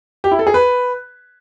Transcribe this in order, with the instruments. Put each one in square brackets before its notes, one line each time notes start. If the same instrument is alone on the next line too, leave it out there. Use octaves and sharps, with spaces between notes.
[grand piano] G4
E4
A4
G#4
B4